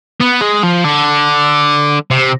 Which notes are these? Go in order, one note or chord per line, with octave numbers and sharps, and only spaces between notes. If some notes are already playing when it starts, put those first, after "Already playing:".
B3
G#3
F3
D3
C3